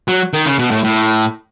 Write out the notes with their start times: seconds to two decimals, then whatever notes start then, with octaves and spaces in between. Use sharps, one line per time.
0.08 F#3
0.33 D#3
0.46 C#3
0.59 B2
0.71 A2
0.84 A2